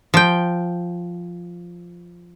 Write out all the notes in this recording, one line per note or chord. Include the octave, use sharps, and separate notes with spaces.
F3 G5